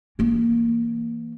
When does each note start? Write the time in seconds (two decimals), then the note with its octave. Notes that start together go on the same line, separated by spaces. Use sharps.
0.19 E3 A#3